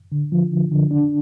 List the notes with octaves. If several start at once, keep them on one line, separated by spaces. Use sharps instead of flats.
D3
F3
D3
D3
D4